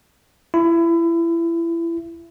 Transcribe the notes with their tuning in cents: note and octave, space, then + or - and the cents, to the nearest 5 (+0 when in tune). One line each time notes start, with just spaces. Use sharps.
E4 +25